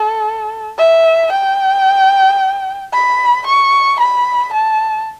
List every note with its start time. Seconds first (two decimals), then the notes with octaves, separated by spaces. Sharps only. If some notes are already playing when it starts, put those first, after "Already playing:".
Already playing: A4
0.78 E5
1.32 G5
2.93 B5
3.47 C#6
4.00 B5
4.53 A5